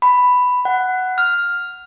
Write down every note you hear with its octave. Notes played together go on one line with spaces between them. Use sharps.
B5
F#5
F6